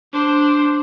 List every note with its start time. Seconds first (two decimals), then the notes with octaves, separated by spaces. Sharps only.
0.13 D4 C5